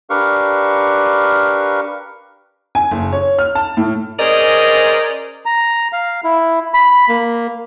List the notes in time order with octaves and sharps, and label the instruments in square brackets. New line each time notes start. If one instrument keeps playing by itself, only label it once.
[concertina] D4 G4 A#4 B4 F5 C#6
[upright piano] G#5
F#1
C#5
F6
A5
A2
[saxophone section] C#4 G#4 A#4 C5 D5 D#5
[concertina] A#5
F5
E4
B5
A#3